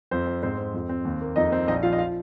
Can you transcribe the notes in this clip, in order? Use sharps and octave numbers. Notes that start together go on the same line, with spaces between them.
F2 C4 C5
C4
G#2 C4 C5
C4
F2
C4
D#2
A#3
F2 D#4 D#5
C4
A#1 D#4 D#5
F3 F4 F5
D#5
F4 F5